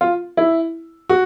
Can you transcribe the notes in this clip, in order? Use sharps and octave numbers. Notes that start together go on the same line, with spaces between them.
F4
E4
F#4